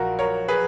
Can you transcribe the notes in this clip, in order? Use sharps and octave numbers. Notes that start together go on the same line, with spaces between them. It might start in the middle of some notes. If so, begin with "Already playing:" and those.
Already playing: A#1 F4 F#4 A#4
A#4 C#5
G#4 B4